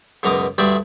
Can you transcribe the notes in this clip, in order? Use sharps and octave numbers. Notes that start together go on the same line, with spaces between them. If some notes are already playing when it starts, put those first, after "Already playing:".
C#2 F#2 B2 A#5 D6 D#6
D2 G2 G#4 D5 E5 G5